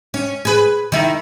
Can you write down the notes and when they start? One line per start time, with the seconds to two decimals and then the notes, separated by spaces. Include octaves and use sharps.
0.14 C#4
0.45 G#4 B4
0.92 D#3 E4